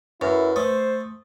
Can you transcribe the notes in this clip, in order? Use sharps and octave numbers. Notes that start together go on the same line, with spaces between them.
F#2 E4 A#4 B4
A3 C5 D#6